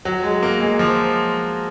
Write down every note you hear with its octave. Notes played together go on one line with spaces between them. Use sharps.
F#3
G#3
A#3
G#3
F3